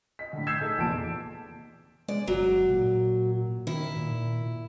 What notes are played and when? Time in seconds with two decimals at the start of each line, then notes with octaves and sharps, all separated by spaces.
0.19 D#5 B6
0.33 A2 D3
0.47 E6 G6 G#6 B6 C7 E7
0.60 D#4 G#4 A4
0.77 F1 E2 A#2 A5 D7
2.08 G#3 D5
2.27 G1 F#3
2.70 A#2
3.67 D#3 E4
3.97 A#2